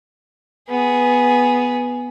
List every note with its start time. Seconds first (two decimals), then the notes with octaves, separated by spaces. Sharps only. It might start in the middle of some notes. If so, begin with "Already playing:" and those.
0.69 B3 G#4